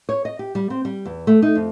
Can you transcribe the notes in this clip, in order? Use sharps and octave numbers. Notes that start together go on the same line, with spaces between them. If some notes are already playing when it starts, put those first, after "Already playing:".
C#5
D#5
G4
G3
C4
G3
E2
A3
D#4
F2